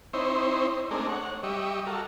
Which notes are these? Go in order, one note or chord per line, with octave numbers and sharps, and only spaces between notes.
C4 D#4 E4 C5 C#5
A3 C4 D4 D#4 G#4 A#4
C#5 F#5
G3 G4 D#5 E5 C#6
F#4 A4 A#4 F5